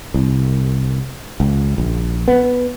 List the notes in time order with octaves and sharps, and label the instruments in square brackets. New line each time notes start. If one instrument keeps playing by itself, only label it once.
[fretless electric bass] C2
C#2
A#1
B3